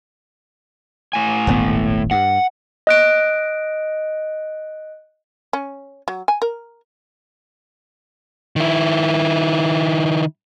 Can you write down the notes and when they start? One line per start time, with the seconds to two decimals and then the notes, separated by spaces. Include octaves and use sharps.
1.13 A2 G#5
1.47 D#1 G#1 B3
2.11 G2 F#5
2.87 D#5 F#6 D7
5.53 C#4
6.08 F#3
6.28 G#5
6.42 A#4
8.56 D#3 E4